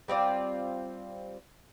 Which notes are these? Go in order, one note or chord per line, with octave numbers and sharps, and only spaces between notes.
G3 C4 F4 D5